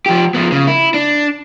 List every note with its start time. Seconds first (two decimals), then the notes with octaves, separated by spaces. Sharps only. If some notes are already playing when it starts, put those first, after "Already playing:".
0.06 F3 G4
0.34 F3 B3
0.52 C#3
0.67 E4
0.94 D4